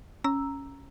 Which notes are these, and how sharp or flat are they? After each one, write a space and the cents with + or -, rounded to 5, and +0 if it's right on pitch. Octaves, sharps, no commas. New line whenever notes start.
C#4 +0 A#5 +0 E6 +0